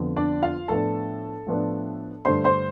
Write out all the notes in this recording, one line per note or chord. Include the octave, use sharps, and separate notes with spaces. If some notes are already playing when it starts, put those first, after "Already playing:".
Already playing: F2 D3 F3 B3
D4 D5
F4 F5
A2 F3 B3 D4 A4 A5
A2 F3 B3 D4
G2 D3 A3 D4 C5 C6
C5 C6